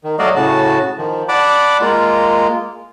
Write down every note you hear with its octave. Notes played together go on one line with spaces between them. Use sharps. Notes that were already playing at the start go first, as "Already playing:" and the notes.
D#3
F#3 A3 F#4 D5 D#5 F5
A2 C#3 F#4 A5
D#3 F3
D5 F#5 A5 B5 D6
G#3 A#3 F4